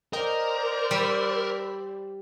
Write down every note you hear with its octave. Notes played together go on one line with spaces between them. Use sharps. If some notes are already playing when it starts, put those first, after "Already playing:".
A#4 C5 D5 D#5 G5 A#5
G3 B5 E6 B6